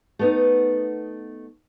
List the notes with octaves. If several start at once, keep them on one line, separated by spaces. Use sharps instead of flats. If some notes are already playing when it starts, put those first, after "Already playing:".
A3 B3 D#4